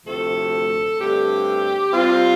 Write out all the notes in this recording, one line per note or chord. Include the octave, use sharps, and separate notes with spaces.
D2 C3 F3 A3 C4 A4
G2 D3 A3 C4 G4
C3 G3 C4 F4